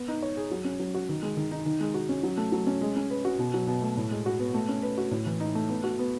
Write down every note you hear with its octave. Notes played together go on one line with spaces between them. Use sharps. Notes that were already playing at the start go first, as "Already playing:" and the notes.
Already playing: B3
D#4
C#5
G#4
F#3
C#4
F#3
F#4
D#3
G#3
D#3
D#4
D#3
G#3
F#4
C#4
F#3
A3
F#3
C#4
G#3
C#4
B4
F#4
B2
F#3
B2
A3
A2
G#3
F#4
B3
A3
C#4
B4
F#4
A2
E3
D#4
A3
B3
F#4
B3